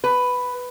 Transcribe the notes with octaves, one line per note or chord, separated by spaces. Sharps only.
B4